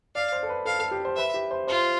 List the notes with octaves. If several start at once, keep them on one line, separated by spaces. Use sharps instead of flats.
D5 F5
C5
A4
B4
A4 F5
A4
G4
C5
B4 E5
G4
C5
F4 C5